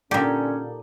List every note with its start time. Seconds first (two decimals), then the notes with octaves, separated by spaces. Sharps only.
0.11 A#2 D3 C#4 D#4 G4 A4 D5